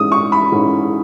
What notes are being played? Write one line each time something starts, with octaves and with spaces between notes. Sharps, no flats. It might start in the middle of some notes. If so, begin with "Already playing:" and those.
Already playing: G#2 E3 G#3 C#4 D#6
C#6
B5
G#2 E3 G#3 C#4